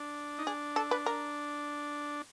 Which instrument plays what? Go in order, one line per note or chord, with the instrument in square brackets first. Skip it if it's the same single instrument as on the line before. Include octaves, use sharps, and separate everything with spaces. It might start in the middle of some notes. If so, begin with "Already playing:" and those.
Already playing: [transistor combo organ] D4
D#4
[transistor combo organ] D4 [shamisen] G#4
[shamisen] A4
B4
A#4